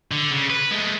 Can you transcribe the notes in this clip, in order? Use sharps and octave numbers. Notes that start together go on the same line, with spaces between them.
D3
C#3
B4
G#3 A3